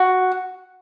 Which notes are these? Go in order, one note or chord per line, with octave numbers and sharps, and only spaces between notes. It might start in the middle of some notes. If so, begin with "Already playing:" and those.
Already playing: F#4